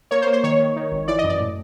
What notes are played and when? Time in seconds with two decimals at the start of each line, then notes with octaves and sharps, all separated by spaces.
0.11 A#3 C#5
0.22 C5
0.27 A#3
0.33 C5
0.44 D#3 C#5
0.59 D#3
0.76 D#3
0.92 G#1
1.08 E3 D5
1.19 D#5
1.24 F#2
1.29 D5
1.40 A2